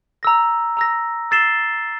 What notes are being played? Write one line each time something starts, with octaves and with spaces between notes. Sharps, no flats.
A#5 E6 A#6
A#5 E6 A#6
E6 A6 C7 E7 G7